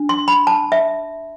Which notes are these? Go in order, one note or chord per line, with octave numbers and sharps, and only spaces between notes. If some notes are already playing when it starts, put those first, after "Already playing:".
Already playing: D4
C6
B5
A5
E5